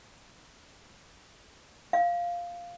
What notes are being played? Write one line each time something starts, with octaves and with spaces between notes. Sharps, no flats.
F5